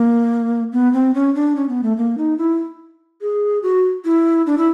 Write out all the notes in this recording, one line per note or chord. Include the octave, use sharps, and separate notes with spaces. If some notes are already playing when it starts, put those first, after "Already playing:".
Already playing: A#3
B3
C4
C#4
D4
C#4
B3
A3
A#3
D#4
E4
G#4
F#4
E4
D4
E4